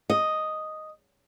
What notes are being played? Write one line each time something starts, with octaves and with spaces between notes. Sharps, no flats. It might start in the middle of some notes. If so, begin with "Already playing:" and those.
D#5